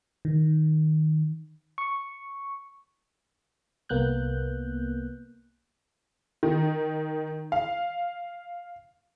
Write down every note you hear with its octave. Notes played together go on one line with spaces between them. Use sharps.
D#3
C#6
C2 A#3 B3 F#6 G6
D#3
F5